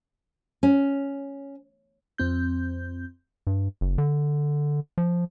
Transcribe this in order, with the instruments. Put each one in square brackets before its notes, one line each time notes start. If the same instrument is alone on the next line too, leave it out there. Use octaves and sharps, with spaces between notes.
[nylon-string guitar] C#4
[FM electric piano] F2 C4 G6
[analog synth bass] G2
F#1
D3
F3